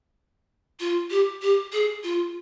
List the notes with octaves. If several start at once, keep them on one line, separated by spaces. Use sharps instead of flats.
F4
G4
G4
G#4
F4